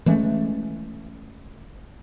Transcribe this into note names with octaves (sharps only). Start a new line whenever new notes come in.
E3 G#3 A3 C#4